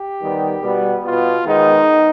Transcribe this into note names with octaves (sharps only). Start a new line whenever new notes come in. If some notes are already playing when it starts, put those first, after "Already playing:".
Already playing: G4
D#3 G3 B3
B2 G3 B3
B2 B3 F4
D#3 G#3 B3 D#4